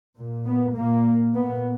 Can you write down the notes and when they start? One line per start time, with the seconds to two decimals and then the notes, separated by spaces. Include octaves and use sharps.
0.18 A#2
0.47 B3
0.75 A#2 A#3
1.34 A#2 B3